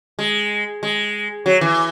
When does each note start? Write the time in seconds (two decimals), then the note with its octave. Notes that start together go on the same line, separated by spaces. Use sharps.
0.19 G#3
0.83 G#3
1.46 F#3
1.61 E3